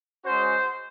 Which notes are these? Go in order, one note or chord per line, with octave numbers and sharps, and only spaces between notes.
G#3 C#4 F#4 C5